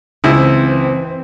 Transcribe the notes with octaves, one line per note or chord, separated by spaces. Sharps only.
C#2 E3 C4 E4